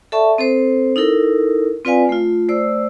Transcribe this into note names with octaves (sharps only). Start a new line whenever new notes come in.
A4 D5 E5 A5 C#6
C4 A4 C5
D#4 E4 A4 A#4
C4 F4 B4 D5 F5 G#5
A3 F4
A3 C5 D5 E6